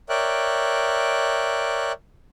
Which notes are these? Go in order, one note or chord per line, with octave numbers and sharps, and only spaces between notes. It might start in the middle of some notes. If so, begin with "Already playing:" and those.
A#4 C#5 D5 E5 G5 F#6